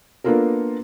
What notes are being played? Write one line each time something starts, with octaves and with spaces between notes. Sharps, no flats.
A#3 B3 D4 F4 A4 A#4